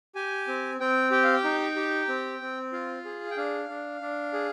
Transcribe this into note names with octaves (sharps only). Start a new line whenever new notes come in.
G4 G#5
C4
C4 G5
G4 G5
F5
G5
D#4
G4
C4
C4
F4 F5
G#4
G5
D4 F5
D4
D4
G#4